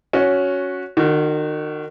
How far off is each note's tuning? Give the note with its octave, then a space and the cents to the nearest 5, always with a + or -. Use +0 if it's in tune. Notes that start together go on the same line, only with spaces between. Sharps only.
C#4 +5 F#4 -10
D#3 -35 F#4 +0